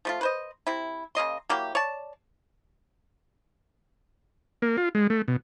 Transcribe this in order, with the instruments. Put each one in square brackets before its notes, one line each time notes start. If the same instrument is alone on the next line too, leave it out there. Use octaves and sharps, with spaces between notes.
[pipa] F3 A3 F4
B4 C5 D#5
C3 E4
C#3 A#3 D#5 C6
F#3 A#3 E4 G4
C#5 D5 A5
[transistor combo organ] A#3
F4
G#3
A3
B2